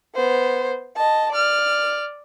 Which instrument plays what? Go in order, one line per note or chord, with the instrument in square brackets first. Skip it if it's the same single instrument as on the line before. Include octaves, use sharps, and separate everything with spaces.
[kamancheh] B3 C5
D#5 A5
D5 F6